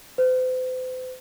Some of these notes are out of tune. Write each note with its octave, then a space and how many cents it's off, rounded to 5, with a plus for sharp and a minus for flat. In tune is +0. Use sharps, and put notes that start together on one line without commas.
C5 -45